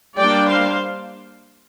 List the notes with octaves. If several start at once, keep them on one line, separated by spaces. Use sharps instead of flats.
G3 A#3 D4 D5 G5
C5 F5